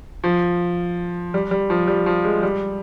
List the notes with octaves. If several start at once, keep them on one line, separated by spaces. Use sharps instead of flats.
F3
G3
G3
F3
G3
F3
G#3
G3